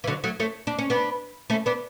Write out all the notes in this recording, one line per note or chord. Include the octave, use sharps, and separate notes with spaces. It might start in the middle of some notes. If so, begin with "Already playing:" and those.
E3
D3 F#3
F#3 A3
A3 C#4
D4
C#4
B3 D4
A3 C#4
B3 D4